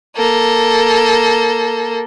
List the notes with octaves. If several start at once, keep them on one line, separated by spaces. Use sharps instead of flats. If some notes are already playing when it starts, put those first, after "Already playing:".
A#3 A4